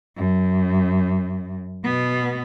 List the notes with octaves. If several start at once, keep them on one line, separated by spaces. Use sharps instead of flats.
F#2
B2 B3